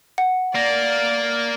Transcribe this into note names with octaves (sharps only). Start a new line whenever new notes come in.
F#5
A#3 D5 A#6